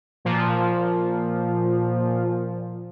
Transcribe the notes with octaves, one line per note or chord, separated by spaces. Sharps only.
A#2 F3